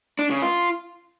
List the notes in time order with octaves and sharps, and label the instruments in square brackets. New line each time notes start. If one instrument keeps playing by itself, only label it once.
[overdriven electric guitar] D4
C#3
F4